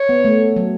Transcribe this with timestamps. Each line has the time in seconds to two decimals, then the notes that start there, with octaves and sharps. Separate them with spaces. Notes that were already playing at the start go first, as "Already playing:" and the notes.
Already playing: C#5
0.09 B3
0.25 A3
0.56 F#3